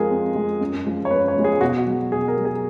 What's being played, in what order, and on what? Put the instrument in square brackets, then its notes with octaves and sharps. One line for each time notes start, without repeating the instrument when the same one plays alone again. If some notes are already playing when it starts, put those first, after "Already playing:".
Already playing: [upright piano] F2 F3 G#3 G#4 A#4
F2
F3 G#3
F#2
F3 G#3
C#5
F#2 B4
C#5
F3 G#3
G#4
B2 F#4
F#4
F#3
B2 G#4
A#4
F#3
G#4